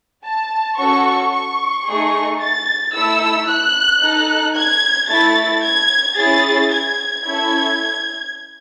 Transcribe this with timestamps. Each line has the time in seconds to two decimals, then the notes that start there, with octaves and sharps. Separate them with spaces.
0.25 A5
0.79 C#4 F#4 A4 C#6
1.33 C#6
1.87 A3 D#4 G#4
2.42 A6
2.95 A3 E4 A4 E6
3.49 F#6
4.03 D#4 A4
4.57 G#6
5.10 A3 E4 A4 A6
5.64 G#6
6.18 C#4 E4 G#4 A6
6.73 G#6
7.27 C#4 E4 A4 G#6